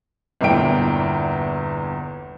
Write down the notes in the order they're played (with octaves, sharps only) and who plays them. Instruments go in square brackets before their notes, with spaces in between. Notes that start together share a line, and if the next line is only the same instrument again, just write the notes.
[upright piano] G1 E2 A#2 E4 G5 D7